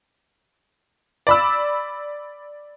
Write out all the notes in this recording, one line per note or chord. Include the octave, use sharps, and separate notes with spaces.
D5 B5 E6